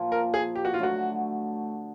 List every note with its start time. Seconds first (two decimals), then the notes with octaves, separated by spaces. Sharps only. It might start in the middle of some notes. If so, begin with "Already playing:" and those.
Already playing: A#2 F3 A#3
0.12 A#4
0.34 G#4
0.55 G4
0.65 F#4
0.74 F4
0.78 D3 F#3 A3 F#4